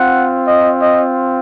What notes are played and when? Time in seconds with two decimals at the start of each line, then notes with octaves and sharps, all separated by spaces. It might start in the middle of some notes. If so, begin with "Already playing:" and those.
Already playing: C4 F4 F#5
0.46 D#5
0.80 D#5